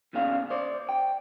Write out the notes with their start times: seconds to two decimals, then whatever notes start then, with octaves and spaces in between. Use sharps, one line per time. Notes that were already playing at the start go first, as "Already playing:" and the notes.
0.13 E2 A#2 C#3 D4 F5
0.50 C5 D5
0.89 G5